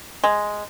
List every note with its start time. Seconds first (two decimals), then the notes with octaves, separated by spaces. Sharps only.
0.24 G#3